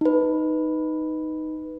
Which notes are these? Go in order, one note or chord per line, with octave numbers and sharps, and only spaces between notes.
D#4 B4